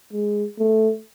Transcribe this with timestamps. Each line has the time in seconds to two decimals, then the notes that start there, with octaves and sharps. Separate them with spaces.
0.13 G#3
0.59 A3